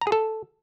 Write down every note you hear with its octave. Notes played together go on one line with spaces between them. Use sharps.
A#5
G#4
A4